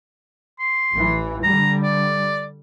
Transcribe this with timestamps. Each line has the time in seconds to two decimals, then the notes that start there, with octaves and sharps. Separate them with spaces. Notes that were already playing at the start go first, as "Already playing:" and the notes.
0.59 C6
0.93 A1 E3
1.43 D3 G3 A#5
1.83 D5